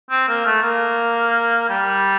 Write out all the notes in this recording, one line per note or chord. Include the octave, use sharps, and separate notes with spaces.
C4
A#3
A3
A#3
G3